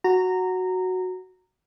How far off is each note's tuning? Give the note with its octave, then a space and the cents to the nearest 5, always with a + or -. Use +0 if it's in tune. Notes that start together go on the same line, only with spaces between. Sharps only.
F#4 +0 A#5 -15